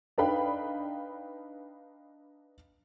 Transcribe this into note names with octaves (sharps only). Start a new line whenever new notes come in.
D4 D#4 B4 F5 G5 B5